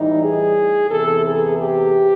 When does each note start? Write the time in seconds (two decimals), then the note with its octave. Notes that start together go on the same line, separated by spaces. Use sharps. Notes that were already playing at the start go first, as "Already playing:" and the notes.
Already playing: A2 E3 G3 D#4
0.23 G#4
0.90 E2 C3 E3 A4
1.24 G#4
1.58 G4